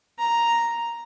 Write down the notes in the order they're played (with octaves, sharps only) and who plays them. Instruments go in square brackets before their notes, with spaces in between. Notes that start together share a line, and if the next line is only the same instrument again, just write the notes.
[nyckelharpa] A#5